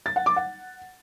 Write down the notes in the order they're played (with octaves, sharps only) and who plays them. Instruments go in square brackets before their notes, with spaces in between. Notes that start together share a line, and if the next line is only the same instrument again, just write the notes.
[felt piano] A6
F#5
D6
F#5